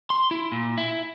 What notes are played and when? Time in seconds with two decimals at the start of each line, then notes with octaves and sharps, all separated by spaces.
0.10 C6
0.31 E4
0.52 A#2
0.78 E4